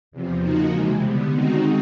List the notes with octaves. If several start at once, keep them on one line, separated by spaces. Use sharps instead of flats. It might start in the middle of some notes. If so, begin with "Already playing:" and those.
E2 C3 F3
C#3 F3 A#3 D#4 F#4
C3 E3 G#3
D3 G3 B3
D#3 G#3 C4 D#4 F#4